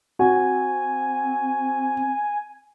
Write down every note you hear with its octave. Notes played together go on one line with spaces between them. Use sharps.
C4 F#4 G#5